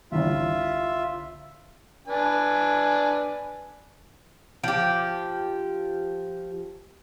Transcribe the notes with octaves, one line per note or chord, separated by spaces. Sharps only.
G1 C2 F4 E5
D4 B4 G#5
F3 G4